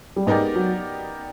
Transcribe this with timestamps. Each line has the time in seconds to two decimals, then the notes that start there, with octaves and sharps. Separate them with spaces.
0.16 G3
0.27 G#2 G#3 B3 D#4 G4 A#4 D5
0.56 F#3